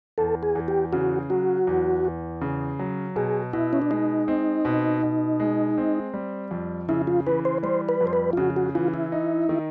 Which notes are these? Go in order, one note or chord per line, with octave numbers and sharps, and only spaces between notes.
E2 A4
G#4
E2
G4
C#3 F#4
F#3 F#4
E2
E2
C#3
F#3
B2 G#4
B2 E4
C#4
D4
G#3 D#4
C4
B2
B2
G#3
C4
G3
F2
C#3 E4
F4
E3 B4
C5
G3 C5
B4
F2
C5
B4
F4
C#3 F#4
F#4
E3 F4
E4
D#4
D#3